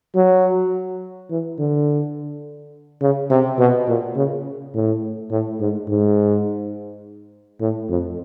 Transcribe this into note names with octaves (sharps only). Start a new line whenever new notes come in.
F#3
E3
D3
C#3
C3
B2
A#2
C#3
A2
A2
G#2
G#2
A2
F2